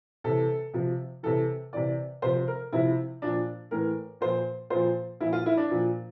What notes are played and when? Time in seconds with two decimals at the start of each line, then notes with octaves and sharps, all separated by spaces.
0.24 C3 E3 A4
0.74 C3 F3
1.23 C3 E3 A4
1.73 C3 E3 D5
2.22 C3 F3 C5
2.48 A#4
2.72 C3 F3 E4
3.22 A#2 F3 D4
3.71 A2 E3 A#4
4.21 A#2 F3 C5
4.70 A#2 C5
4.75 F3
5.20 A#2 F3 E4
5.33 F4
5.46 E4
5.57 D4
5.70 A#2 F3